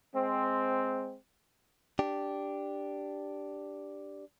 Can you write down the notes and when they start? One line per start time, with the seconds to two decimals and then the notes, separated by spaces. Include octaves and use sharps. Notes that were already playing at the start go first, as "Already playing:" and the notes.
0.14 G#3 C4
1.99 D4 G4